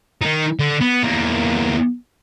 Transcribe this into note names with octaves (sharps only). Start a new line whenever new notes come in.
D#3 D#4
D3
B3
E2 A#3